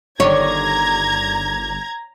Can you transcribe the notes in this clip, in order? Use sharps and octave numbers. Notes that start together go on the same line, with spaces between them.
G1 D3 D#3 G3 C#5 A#5 G#6